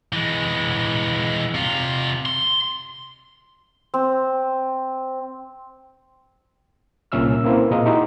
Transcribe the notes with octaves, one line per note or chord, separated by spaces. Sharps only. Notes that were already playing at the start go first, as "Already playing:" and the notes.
E3 G#3
C3 F4
C6
C4
C2 A#2 C#4 E5 E6 F6
A#3 C4 E4 B4 C5
A#2 G#4 A#4 D#5 F5
D#4 E4 F#4 G4 C6